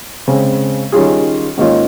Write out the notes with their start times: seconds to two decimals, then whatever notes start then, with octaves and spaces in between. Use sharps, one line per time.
0.28 C#3 G#3 C4
0.92 D#3 G3 C#4 F4 G#4
1.57 G#2 D#3 A#3 C#4 F4